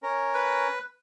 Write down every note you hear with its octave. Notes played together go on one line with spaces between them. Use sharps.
C#4 A#4
B4